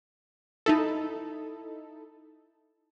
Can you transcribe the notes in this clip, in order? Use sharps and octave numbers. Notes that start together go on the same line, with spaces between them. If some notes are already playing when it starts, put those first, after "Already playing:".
D#4 E4 A4